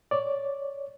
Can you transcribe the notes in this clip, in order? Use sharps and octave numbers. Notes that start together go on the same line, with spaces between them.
C#5 D5